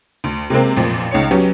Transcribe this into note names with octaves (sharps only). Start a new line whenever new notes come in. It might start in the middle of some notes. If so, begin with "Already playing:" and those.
D2
C3 G#3 A#3 C4
A1 F2 A#2 F3
C#2 D#4 C#5 C#7
F#3 B3 C#4 G4